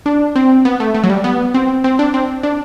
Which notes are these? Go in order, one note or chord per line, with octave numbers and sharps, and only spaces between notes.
D4
C4
B3
A3
A3
F#3
G3
B3
C4
C4
D4
C4
D4